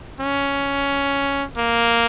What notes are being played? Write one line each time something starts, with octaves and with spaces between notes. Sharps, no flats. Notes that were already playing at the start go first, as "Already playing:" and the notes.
C#4
A#3